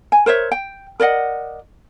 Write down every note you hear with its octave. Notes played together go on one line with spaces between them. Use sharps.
G#5
A#4 C5 C#5 E5
G5
A#4 D5 D#5 F#5